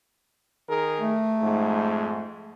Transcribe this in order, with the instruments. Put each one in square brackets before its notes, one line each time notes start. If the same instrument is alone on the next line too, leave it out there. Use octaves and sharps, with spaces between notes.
[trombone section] D#3 G#4 A#4
[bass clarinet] A3
[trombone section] F2 G#2